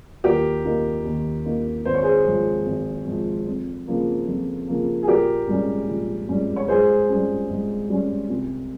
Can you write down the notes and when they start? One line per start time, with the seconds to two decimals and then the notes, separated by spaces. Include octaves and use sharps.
0.24 D#2 G4 A#4
0.65 D#3 A#3 D#4
1.05 D#2
1.45 D#3 A#3 D#4
1.85 G#1 C5
1.94 C#5
2.03 G#4 C5
2.26 G#2 F3
2.66 G#1
3.07 G#2 F3
3.46 F2
3.88 C#3 F3 A#3
4.27 F2
4.68 C#3 F3 A#3
5.03 G#4
5.07 A#1 G4 A#4
5.48 G#2 G3 C#4
5.88 A#1
6.28 G#2 G3 C#4
6.56 C#5
6.68 G#2 G#4 C5
7.09 G3 C#4
7.50 G#2
7.89 G3 C#4
8.29 C2